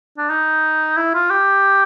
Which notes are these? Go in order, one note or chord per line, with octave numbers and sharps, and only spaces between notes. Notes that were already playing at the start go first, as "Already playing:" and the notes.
D4
D#4
E4
F4
G4